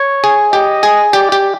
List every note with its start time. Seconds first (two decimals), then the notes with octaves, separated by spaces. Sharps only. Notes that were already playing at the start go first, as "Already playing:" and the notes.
Already playing: C#5
0.24 G#4
0.53 G4 D#5
0.83 G#4
1.13 G4 D5
1.32 G4